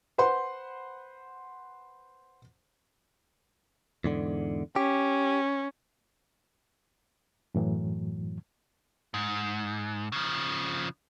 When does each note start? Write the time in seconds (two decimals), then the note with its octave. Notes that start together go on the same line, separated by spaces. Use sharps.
0.18 B4 C5 F#5 C6
4.04 E2 G#2 D3
4.76 C#4 G4
7.54 F#2 A2 E3 F#3
9.14 G#2
10.12 C#3 F3